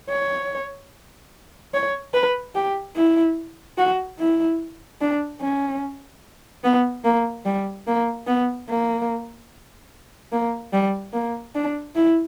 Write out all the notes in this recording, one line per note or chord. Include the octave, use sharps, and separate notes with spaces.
C#5
C#5
B4
G4
E4
F#4
E4
D4
C#4
B3
A#3
G3
A#3
B3
A#3
A#3
G3
A#3
D4
E4